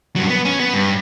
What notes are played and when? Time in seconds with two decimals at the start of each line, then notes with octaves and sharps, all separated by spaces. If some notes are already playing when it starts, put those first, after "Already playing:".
0.16 G2 F#3
0.29 B3
0.45 C#4
0.60 B3
0.74 G2